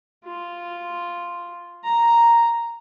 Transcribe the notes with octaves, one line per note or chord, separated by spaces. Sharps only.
F4
A#5